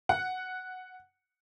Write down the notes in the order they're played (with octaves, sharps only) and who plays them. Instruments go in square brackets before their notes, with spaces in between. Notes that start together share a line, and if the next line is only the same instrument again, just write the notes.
[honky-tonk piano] F#5